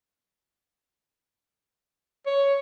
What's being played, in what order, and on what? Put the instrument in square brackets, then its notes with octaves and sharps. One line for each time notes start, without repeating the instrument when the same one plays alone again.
[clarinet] C#5